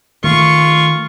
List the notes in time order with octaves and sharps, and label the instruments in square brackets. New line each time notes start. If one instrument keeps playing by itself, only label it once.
[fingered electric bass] D#3 A3 [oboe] F4 [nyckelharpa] C#6